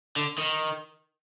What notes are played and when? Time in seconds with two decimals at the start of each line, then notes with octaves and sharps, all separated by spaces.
0.16 D3
0.38 D#3